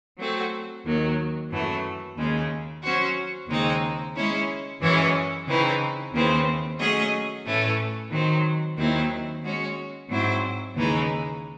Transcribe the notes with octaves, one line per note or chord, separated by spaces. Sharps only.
F#3 A3 C4 F#4
D#2 D#3 F#3
F#2 E3 A3
D#2 C#3 G#3
F#3 C#4 F#4 C5
D#2 C#3 G#3 C4 D#4
G#3 C#4 E4
F#2 E3 G#3 C#4 E4
C#3 E3 C4 D#4
D#2 C#3 E3 C4
F#3 A3 C#4 G#4 D#5
A2 E3 A3 C#4
D#3 F#3 C4
D#2 D#3 F#3 C4 E4
G#3 C#4 F#4
G#2 F#3 C4 E4 C5
D#2 C#3 E3 G#3 D#4